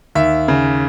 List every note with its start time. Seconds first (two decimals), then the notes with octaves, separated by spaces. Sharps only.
0.15 D#2 E5
0.48 C#3